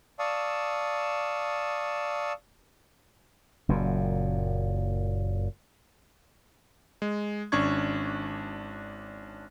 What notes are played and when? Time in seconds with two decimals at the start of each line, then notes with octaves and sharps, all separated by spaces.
0.19 D5 F5 A5 C#6 D#6 E6
3.69 F#1 F#2 A#2
7.02 G#3
7.52 G#1 C#4 D4 C#6 G#6